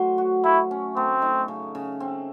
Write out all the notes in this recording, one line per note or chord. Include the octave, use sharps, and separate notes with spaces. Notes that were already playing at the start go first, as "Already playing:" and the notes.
Already playing: A2 F#3 C5
F#4
A3 E4
C#4
A3 C4
D#4
C#3
C#3
C4